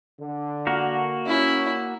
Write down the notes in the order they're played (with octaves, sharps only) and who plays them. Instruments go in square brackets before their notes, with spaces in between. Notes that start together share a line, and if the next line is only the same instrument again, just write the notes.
[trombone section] D3
[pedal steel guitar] A#3 F#4 A#4
[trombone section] C#4 [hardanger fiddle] E4